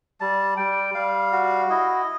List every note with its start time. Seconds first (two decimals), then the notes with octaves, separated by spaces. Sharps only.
0.20 G3 A5
0.57 G3 G5
0.94 G3 F5
1.32 F#4
1.70 E4 D#5